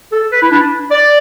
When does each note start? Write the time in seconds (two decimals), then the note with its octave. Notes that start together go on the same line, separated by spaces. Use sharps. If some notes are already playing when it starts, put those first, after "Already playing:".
0.12 A4
0.32 B4
0.42 E4
0.51 D4
0.91 D5